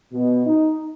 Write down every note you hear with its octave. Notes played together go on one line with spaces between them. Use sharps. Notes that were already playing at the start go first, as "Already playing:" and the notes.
B2
D#4